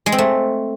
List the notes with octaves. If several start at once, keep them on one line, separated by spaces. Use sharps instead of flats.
G#3
C4
A3